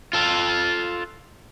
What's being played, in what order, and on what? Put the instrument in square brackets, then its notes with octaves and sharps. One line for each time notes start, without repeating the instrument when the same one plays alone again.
[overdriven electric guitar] F4 A4